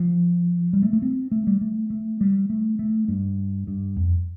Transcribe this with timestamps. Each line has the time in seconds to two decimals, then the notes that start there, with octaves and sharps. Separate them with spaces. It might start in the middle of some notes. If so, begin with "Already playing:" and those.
Already playing: F3
0.73 G3
0.82 A3
0.93 A3
1.02 C4
1.31 A3
1.47 G3
1.61 A3
1.90 A3
2.21 G3
2.50 A3
2.79 A3
3.08 G2
3.67 G2
3.96 F2